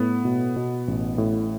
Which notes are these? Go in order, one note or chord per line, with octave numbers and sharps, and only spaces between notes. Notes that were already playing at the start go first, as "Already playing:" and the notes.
Already playing: A2 B3
B2
B2
A1
A2